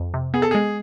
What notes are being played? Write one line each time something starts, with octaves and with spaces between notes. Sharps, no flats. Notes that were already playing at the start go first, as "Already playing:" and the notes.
Already playing: F2
C3
B3 G#4
A4
G#3 G#4